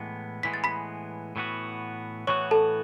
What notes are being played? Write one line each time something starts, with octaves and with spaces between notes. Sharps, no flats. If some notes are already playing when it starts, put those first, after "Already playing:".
Already playing: A2 E3 G#3 B3
A2 E3 G#3 B3 B6
A6
B5 B6
A2 E3 B3 F#4
A2 E3 B3 F#4 C#5 C#6
A4 A5